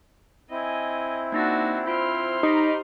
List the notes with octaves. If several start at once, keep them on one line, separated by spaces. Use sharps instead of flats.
C4 E4 D#5 G#5
A#3 D4 D#4 F#4 A#6
F4 C5 B5 F6 D7
D#4 G4 B5 D6